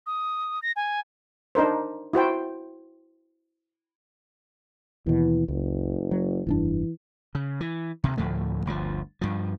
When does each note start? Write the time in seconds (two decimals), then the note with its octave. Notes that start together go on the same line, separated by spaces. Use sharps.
0.06 D#6
0.62 A#6
0.76 G#5
1.55 D4 D#4 A#4 C5
2.13 E4 F#4 C5 G5
5.06 D#2 B2 E3
5.48 F#1 C#2
6.11 F#3
6.47 F1 G2 E3 D4
7.35 C#3
7.61 E3
8.04 D2 C3
8.18 D2 A2 F3 A3
8.66 G1 D2 C#3 F3
9.21 G2 F3